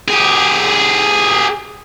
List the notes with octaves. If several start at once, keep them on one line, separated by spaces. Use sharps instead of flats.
G4 G#4